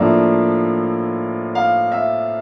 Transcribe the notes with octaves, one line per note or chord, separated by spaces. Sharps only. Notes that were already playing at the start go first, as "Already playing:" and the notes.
Already playing: A2 F3 A#3 D4 D5 E5
F5
E5